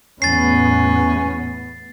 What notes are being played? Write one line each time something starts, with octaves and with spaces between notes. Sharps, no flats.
E2 A2 B3 C#4 A6 C7